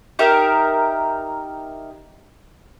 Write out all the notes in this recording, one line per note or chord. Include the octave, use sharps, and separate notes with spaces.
D#4 G4 A#4 E5